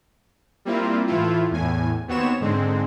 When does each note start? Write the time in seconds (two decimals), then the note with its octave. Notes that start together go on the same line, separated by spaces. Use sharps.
0.65 G3 A#3 C4 E4 F4
1.07 A2 E3 A3 E4 F4
1.51 E2 A2 G#5
2.08 D#2 B3 C4 F#4 C#5 E7
2.40 G#2 D3 G#3 C4